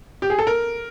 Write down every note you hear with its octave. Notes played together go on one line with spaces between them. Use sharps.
G4
G#4
A4
A#4